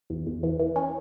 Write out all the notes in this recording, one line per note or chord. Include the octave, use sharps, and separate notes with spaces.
E2
E2
E3
E3
C#4